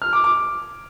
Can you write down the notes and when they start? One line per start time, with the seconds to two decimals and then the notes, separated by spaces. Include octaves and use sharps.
0.02 F6
0.13 D6
0.24 D6